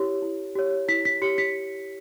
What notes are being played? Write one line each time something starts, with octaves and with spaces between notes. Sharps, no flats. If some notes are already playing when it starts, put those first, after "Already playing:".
Already playing: E4 G4 C#5
E4
G4 C#5
E4 B6
B6
G4 C#5 C#7
B6